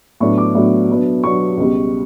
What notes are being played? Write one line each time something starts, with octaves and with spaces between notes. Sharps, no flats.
A2 F#3 B3 D4 C#6
D6
A2 F#3 B3 D4
B2 F#3 B3 D4
B2 F#3 B3 D4 C#6
C#2 B2 G3